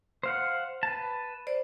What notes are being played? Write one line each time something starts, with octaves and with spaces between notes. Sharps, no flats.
C5 F5 F#5
B4 A5
C5 D5